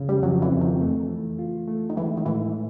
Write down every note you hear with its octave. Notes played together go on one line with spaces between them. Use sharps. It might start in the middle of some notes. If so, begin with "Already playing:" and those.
Already playing: F2 C#3
G3
F2 F#3
E3
F2
D#3
A3
E3
F4
A3
D#3
E3 G#3
D#3
A2 E3